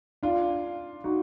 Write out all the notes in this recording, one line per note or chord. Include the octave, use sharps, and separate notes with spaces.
D4 F4
D#4 F#4